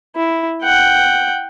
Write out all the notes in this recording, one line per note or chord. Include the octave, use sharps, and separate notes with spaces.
E4
F#5 G5